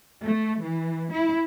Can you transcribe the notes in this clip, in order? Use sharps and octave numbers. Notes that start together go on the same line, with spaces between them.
A3
E3
E4